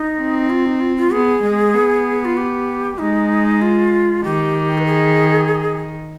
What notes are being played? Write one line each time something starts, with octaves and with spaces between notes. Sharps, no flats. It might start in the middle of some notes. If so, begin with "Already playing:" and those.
Already playing: D#4
C4
F4
D#4
F4
F4
B3 G#4
G#3
B3
F4
G4
G#3 D#4
F4
D#3 G4
B4
G#4